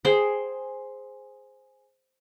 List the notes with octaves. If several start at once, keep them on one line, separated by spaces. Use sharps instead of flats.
G#4 C5 G5